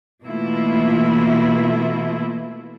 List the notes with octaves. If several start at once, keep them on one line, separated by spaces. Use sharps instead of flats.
B2 E3 A3 A#3 E4 F4